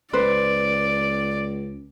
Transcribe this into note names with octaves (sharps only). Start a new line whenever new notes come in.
C#2 B4 C5 D5